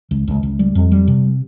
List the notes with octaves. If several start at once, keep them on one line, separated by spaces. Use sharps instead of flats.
C#2
C#2
C#2
G3
F2
G3
C3